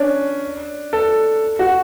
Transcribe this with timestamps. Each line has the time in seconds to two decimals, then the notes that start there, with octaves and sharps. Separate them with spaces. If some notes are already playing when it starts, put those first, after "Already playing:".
Already playing: C#4 D4
0.93 A4
1.59 F#4